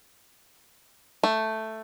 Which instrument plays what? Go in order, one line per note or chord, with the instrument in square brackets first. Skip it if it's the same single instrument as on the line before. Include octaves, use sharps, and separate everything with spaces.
[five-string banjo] A3